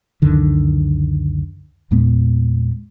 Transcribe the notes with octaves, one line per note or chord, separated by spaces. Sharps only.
C#2 F#2 D3 D#3
E2 A#2 G#3 B3